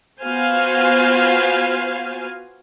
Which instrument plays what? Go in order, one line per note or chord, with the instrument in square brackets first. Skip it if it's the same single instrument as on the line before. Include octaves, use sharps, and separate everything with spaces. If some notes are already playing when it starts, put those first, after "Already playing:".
[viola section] B3 F4 F#4 C5 F5 G#5